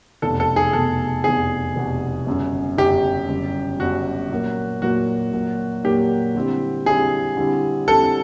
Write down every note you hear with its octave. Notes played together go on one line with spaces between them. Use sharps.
F1 E2 B2 A4
A4
G#4
F1 E2 B2 A4
F1 E2 B2 G#4
F1 E2 B2
G1 F#2 C#3
G1 F#2 C#3 G4
G1 F#2 C#3
G1 F#2 C#3 F#4
A#2 F#3 A#3
A#2 F#3 A#3 F#4
A#2 F#3 A#3
A#2 F#3 A#3 G4
D3 G3 C4 E4
D3 G3 C4 E4 G#4
D3 G3 C4 E4
D3 G3 C4 E4 A4